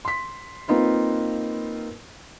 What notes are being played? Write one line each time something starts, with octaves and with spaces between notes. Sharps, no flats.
C6 B6
A#3 C4 D#4 F4 B4